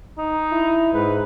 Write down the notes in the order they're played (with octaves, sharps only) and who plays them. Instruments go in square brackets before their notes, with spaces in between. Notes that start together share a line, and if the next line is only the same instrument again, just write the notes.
[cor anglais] D#4
[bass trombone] E4
[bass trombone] G#2 [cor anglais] B4